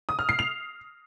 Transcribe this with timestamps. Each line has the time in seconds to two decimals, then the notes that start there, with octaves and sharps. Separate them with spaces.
0.09 D#6
0.19 F6
0.29 C7
0.39 F7